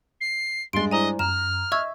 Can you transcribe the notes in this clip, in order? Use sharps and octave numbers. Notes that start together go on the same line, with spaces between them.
C7
G2 G#3 C6 A6 D7
E4 C5 D5 D#5 G#5 A#5
F#2 A#5 F6 E7
D#5 E5 C#6 E6 G#6